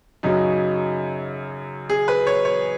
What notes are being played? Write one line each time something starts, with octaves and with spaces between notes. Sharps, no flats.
F#2 C#3 F#3 D#4
G#4
B4
C#5
C#5